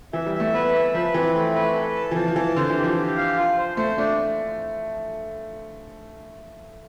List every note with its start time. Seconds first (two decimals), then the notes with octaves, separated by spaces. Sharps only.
0.13 E3 E5
0.26 G3
0.34 E5
0.40 A3
0.54 B3 B4
0.74 E5
0.94 F3 B4
1.14 E3 C4
1.35 A3
1.55 B4
1.75 A4
1.96 A5
2.11 E3
2.16 F3 A5
2.28 F3
2.36 E3 A5
2.56 D3 C5
2.70 E3
2.77 G4
2.84 F3
2.97 G4
3.17 F5
3.37 F4
3.58 C5
3.77 A3 C5
3.97 A3 D4